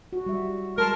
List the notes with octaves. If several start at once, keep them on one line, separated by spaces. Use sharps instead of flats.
F#4
G3 E5
G3 G#3 A#4 A5 C6 F6